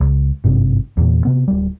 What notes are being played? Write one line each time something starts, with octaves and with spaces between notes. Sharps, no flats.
C#2
G#1 G2 C3
E2 A#2
C3 B3
D1 G3